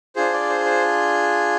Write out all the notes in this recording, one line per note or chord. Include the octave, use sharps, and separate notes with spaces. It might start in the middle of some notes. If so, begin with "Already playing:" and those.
D4 F4 G#4 C5
D5
C5
C5